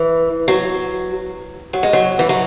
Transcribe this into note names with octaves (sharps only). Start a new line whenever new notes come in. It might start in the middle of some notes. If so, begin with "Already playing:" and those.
Already playing: E3
F#3
F#3
G#3
F#3
E3
F#3